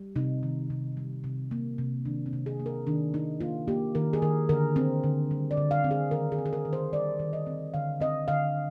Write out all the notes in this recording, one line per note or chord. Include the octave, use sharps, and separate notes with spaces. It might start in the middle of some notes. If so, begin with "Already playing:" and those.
Already playing: G3
C3 D#4
D#3
C3
G3
C3
A#3
C3
D#3 D4
C4
C3
G#4
A#3
A#4
D#3 D4
D#3 D#4
A#3 F4
A#3 G4
D#3 A#4
G#4
D#3 A#4
D3 A#4
C4
D3
G3
D5
D3
F5
C4
G#4
D#3 A#4
G#4
C4
G#4
A#4
D#3
C5
G3 D5
D#3
D#5
C4
D3 F5
C4 D#5
D3 F5